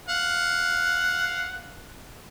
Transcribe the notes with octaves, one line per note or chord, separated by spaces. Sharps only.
F5 F#5